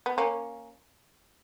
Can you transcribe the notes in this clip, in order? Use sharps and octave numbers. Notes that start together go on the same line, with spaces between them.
B3
A#3 C#4